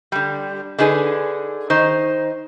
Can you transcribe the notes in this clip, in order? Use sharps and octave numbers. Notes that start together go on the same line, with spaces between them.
D3 G3
D3 D#4 G#4 B4
D#3 D#4 C5